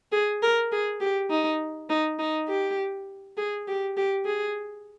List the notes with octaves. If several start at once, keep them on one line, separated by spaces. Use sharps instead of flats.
G#4
A#4
G#4
G4
D#4
D#4
D#4
G4
G#4
G4
G4
G#4